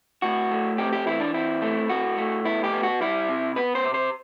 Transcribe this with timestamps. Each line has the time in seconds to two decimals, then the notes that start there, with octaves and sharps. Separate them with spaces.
0.22 A2 F#4
0.51 A3
0.78 C4 G4
0.93 G4
1.06 E3 E4
1.20 D4
1.34 C4 E4
1.62 A3
1.89 A2 F#4
2.18 A3
2.45 B3 E4
2.64 G4
2.73 B3
2.83 F#4
3.01 G3 E4
3.28 C3
3.56 B3 B4
3.75 C5
3.85 C3
3.94 C5